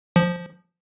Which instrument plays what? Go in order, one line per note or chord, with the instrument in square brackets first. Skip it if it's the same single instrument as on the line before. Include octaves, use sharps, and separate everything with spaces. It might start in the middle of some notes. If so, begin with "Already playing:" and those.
[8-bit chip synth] F3